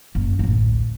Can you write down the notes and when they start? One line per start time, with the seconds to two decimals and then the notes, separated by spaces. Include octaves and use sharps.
0.15 F#1
0.39 A1 D2